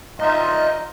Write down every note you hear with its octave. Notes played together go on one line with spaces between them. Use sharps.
D#4 F4 D#5 E5